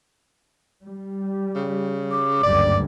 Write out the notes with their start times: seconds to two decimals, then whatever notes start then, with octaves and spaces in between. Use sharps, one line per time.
0.83 G3
1.55 C#3
2.11 D6
2.43 F#1 D2 G2 D5